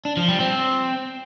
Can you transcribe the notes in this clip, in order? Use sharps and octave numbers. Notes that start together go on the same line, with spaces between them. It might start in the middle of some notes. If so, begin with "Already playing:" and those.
D4
F3
G3
C4